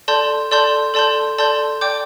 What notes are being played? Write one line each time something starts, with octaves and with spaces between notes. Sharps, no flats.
A4 D5 A5 C6 G6
A4 D5 A5 C6 G6
A4 D5 A5 C6 G6
A4 D5 A5 C6 G6
D5 G5 D6 G6